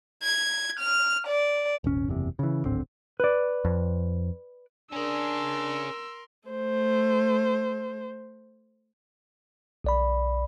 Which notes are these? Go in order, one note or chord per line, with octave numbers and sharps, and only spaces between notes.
G#6
F6
D5
D#1 G#1 C#4
F#1 E2 C3
C#3 E3
D1 G#1 D3 C4
B4 D5
F2
C#4 D4 G#4 A#4 C6 E6
A3 C5
B1 D5 B5